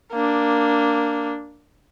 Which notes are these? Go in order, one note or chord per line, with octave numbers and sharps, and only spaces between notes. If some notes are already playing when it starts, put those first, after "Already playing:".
A#3 D4